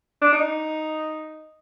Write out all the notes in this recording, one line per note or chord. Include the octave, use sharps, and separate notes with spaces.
D4
D#4